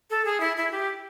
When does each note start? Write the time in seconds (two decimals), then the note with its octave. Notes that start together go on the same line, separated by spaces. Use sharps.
0.10 A4
0.25 G#4
0.40 E4
0.57 E4
0.72 G4